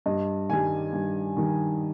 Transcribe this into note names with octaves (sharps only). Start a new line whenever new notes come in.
G2 D#5
D#3 G3 G#5
G2
D#3 G3